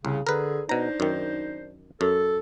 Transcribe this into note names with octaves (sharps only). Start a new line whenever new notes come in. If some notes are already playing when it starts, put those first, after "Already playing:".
C2 C#3
D3 G#4 A#4 B4
B2 D4 D#4 C5 A#5
F#2 D#3
F#2 A4